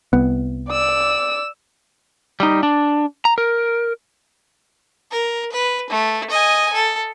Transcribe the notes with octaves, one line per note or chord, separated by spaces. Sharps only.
C2 B3
D5 E6
G3 D#4
D4
A#5
A#4
A#4
B4
A3
D#5 G#5
A4